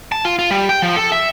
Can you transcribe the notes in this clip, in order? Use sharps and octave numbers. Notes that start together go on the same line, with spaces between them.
A5
F4
F4
G3
G5
F3
A4
E5